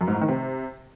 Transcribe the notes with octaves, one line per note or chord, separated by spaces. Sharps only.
F#2
G#2
A2
D#3
C3